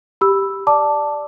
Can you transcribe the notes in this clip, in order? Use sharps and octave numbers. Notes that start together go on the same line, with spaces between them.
G4 B5 E6
D5 A5 D6